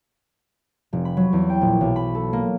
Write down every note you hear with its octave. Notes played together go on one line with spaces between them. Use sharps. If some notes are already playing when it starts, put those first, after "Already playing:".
F1
B5
F#3
E2
G5
A#1
B1
B5
A4
A#3